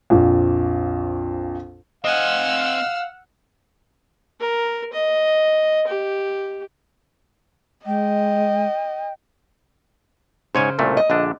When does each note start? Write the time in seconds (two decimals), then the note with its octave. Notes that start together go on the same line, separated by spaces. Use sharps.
0.10 A#1 F2
2.04 C4 D#5 F5 F#5 G#5 E6 F6
4.40 A#4
4.93 D#5
5.87 G4
7.86 G#3 D#5 G5
10.55 G#2 C#3 C5 C#5 G#5
10.79 C2 A#2 A3
10.97 D#5
11.10 A#1 D3 D4